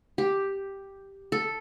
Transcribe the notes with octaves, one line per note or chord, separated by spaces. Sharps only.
G4
A4